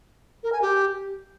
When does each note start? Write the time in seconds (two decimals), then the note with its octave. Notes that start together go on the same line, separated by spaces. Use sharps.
0.43 A#4
0.53 G#5
0.62 G4